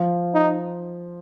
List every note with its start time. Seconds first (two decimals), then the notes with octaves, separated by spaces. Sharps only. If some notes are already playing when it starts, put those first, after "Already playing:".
Already playing: F3 F4
0.34 D#4